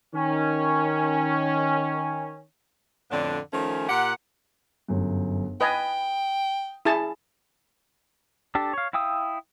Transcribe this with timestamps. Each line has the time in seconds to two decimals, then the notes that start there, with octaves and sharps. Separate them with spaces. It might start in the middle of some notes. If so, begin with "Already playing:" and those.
0.14 D#3 C#4
3.11 F2 A2 D3 B3 D4
3.53 D#3 F3 A3 C#4
3.89 A#2 G4 F#5
4.88 G1 F#2
5.61 B4 D#5 G5 G#5 D#6
6.85 E4 G#4 A5
8.55 D4 G4 A4
8.73 C#5 F5
8.93 E4 F5 G5 D#6 E6